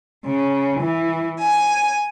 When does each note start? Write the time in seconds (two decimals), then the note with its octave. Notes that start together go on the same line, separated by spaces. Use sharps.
0.25 C#3
0.81 E3
1.39 G#5